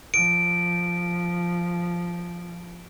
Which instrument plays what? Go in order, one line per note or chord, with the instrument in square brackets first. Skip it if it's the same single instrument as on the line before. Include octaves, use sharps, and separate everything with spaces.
[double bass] F3 [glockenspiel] D7